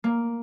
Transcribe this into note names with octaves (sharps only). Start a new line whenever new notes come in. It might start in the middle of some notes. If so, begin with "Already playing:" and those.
A#3